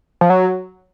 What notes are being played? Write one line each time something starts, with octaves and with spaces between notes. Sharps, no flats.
F3
F#3